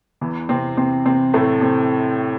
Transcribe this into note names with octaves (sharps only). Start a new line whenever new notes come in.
E2 E3
C3 C4
C3 C4
C3 C4
A2 A3
C3 C4